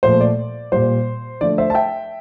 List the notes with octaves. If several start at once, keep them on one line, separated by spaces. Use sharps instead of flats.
A#2 F3 A3 C5
D5
A#2 G3 C5
D3 F3 A3 D5
C5 E5
A5
E5 G5